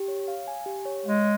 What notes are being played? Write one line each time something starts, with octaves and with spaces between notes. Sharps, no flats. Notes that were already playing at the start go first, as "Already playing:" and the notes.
Already playing: G4
C#5
F5
G#5
G4
C#5
G#3 F5